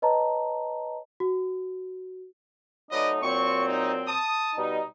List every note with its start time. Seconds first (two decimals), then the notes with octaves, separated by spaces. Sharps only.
0.02 B4 C#5 D#5 A5 A#5
1.20 F#4
2.91 F#3 A3 D#4 B4 D5 D#5
3.22 A#2 F#3 C4 C#6
3.68 D#4
4.07 A5 D#6
4.56 B2 G3 D#4